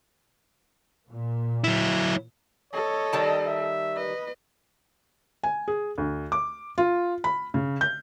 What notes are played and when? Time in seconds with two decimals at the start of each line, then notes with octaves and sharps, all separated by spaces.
1.09 A#2
1.64 F#3 E4
2.73 A4 C#5 D#5
3.13 D#3 G3 A5
3.47 E5
3.95 B4 D#5
5.43 G#5
5.68 G#4
5.98 D2
6.32 D6
6.78 F4
7.24 B5
7.54 C#3
7.81 G6